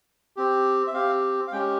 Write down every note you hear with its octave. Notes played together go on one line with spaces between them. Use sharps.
C4 G4
E5
C4 G4 F5
F5
G#3 C#4 G4 G5